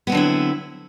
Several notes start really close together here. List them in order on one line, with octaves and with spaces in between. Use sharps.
B3 C4 D3 F#3 E4